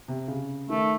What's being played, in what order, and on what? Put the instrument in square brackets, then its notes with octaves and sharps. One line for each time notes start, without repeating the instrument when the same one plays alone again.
[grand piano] C3
C#3
[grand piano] D#3 [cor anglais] A3